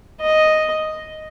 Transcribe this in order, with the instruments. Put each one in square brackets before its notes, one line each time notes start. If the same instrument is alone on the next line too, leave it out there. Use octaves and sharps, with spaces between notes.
[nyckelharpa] D#5